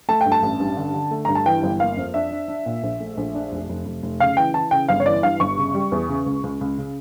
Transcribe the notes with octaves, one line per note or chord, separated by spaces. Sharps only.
A3 A5
G2 G5
A5
A1
G2
D3
D3
A3
G2 A#5
A5
E3 G5
G1
A#3 F5
F2
D4 E5
D4
D4
A#2
A#1
A3
A#1
D4
F1
F1
F1
F1
C#3 F5
E3 G5
E3 A5
C#3 G5
G1 F5
C#5
E3 D5
G2 F5
G1 C#6
C#3
G3
E2
C#3
C#2
C#2
C#2
C#3